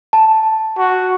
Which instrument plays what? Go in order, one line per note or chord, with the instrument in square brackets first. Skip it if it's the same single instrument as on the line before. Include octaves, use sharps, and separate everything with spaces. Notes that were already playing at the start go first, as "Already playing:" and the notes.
[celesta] A5
[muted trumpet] F#4